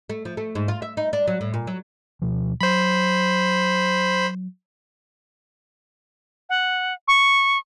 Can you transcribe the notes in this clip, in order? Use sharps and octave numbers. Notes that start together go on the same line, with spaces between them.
A3
F3
A3
G#2
F4
E5
D#4
D4
F#3
A2
A#2
F#3
D2 B2 F3
F#3 C5 B5
F#5
C#6